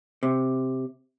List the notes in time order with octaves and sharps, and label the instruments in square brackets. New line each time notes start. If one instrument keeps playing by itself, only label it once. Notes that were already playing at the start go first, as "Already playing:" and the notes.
[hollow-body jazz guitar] C3